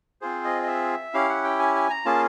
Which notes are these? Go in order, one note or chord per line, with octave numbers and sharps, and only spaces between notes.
C4 F4 G#4 C5
D#5
D#5
E5
C#4 E4 G4 F5
F#5
G5
G#5
G#5
A#5
A#3 C#4 F4 G#4 A5